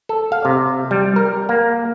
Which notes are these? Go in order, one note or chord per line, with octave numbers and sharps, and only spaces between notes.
A4
F5
C3
G3
A#4
A#3